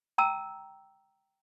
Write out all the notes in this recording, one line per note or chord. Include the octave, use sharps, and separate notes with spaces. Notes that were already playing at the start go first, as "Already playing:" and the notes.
G5 A5 A#5 E6